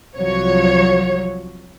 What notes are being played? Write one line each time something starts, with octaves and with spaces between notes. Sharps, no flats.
C2 F3 F#3 C#5